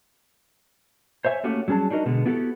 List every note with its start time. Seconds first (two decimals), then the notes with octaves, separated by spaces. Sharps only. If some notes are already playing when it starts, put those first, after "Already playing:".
1.25 C5 C#5 E5 G#5
1.44 A3 A#3 C#4 F#4 G4 A4
1.68 F#3 G3 C#4 G#4 A5
1.90 D4 D#4 F#4 A#4 D#5
2.06 B2 D3 G#3 B3
2.26 B3 E4 F#4 G4 A4